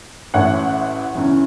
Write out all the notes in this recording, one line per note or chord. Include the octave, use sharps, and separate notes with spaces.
A1 A2 A3 C#4 C#5 F#5
E2 C#3 E3 C#4